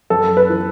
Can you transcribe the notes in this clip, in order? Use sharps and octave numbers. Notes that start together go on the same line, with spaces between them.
F#2 A4
B4
E3